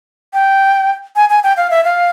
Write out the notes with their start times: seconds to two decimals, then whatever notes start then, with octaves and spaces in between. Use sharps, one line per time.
0.34 G5
1.16 G#5
1.30 G#5
1.44 G5
1.57 F5
1.71 E5
1.84 F5